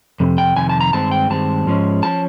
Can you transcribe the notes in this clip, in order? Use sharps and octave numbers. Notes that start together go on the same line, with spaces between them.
F2 C3
G5
F2 C3 D#3 G#5
A5
A#5
G2 D#3 G#3 C4 A5
G5
G2 D#3 G#3 C4 A5
G#2 F3 G#3 C#4
F3 C#4 A5